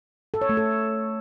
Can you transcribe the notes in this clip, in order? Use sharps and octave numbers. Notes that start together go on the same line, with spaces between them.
A4
C#5
A3
A4